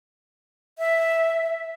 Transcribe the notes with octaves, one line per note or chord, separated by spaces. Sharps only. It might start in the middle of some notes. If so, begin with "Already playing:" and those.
E5